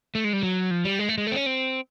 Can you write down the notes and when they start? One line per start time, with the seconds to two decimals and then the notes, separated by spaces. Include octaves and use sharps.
0.15 A3
0.24 G#3
0.33 G3
0.43 F#3
0.71 F3
0.85 G3
0.99 G#3
1.09 A3
1.18 G#3
1.27 A3
1.32 C4
1.36 C#4
1.46 C4